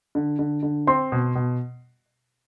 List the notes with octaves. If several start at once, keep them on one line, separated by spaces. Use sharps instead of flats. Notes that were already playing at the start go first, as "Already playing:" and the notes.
D3
D3
D3
C4 C6
B2
B2